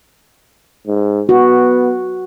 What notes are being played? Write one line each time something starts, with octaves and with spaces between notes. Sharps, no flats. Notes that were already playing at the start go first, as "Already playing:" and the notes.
G#2
B3 F#4